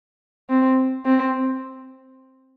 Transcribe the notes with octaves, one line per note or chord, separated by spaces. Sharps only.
C4
C4